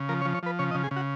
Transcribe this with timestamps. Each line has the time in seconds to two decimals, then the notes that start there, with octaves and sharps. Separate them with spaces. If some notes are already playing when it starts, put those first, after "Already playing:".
Already playing: C#3
0.09 F3 A#4
0.22 C#5
0.25 F3
0.34 C#5
0.43 F3 B4
0.59 C#3 C#5
0.71 D#5
0.74 C#3
0.84 G#4
0.91 C#3
0.96 F#4